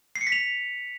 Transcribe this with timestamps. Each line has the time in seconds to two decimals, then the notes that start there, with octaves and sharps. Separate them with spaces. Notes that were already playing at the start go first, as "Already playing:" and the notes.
0.15 C7
0.21 C#7
0.27 B6
0.32 F7